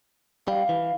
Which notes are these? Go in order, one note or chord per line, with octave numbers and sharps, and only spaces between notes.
G3 F5
E3